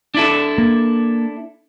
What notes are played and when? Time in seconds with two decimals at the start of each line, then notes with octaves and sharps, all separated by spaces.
0.14 D4 E4 A4
0.58 A#3